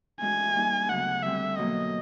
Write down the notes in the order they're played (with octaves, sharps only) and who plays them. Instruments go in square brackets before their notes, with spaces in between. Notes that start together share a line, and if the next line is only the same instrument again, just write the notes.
[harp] A2 E3 G#3 C#4 F#4 [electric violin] G#5
[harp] G3 A#3 D#4
[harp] D2 C#3 F#3 B3 [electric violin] F#5
[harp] D3 G3 C4 [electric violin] E5
[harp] B2 F#3 A#3 [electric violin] D#5